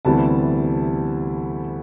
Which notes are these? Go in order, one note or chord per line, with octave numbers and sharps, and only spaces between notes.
D2 C3 E3 G3 B3 A5